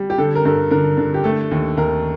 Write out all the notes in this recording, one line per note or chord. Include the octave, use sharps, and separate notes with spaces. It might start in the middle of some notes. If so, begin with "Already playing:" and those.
Already playing: G3
G4
D3 A4
A#4
G2 A4
D3 A#4
D3
G4
A3 A4
D#2
D#2 A#4